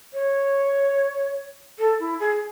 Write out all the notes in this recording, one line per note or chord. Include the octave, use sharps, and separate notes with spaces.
C#5
A4
E4
G#4